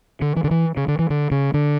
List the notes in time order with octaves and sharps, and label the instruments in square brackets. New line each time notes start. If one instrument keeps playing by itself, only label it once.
[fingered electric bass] D3
E3
D3
E3
C#3
D3
E3
D3
C#3
D3